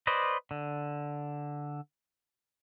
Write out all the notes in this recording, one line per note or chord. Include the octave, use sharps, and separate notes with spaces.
B4 C5 D5 D#5
D3